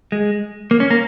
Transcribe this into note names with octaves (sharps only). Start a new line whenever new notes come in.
G#3
A#3
C#4
A#3